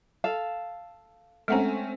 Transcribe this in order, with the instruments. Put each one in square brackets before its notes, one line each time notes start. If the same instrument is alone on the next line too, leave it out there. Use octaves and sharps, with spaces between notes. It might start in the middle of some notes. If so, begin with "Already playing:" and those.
[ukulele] A4 F5
[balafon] G#3 F#5 A#5 [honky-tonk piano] A3 C4 C#4